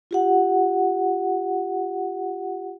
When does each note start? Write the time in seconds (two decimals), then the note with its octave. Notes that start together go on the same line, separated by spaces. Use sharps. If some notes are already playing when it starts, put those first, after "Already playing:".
0.11 F4 G4 F#5